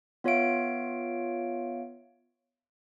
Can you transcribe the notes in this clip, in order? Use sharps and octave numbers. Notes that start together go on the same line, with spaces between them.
B3 F4 C#5 E5 F5 D7